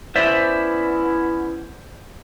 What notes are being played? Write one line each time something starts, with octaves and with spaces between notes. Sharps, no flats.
B3 C#4 E4 C5 D5 E5